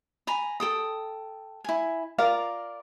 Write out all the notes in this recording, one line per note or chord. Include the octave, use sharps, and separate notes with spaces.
G#5 A#5 B5
A4 G5 D#6
E4 G#5
F4 A#4 D5 F5